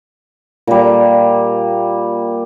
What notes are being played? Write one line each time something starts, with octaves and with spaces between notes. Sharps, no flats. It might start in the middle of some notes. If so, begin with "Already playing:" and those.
A#2 G3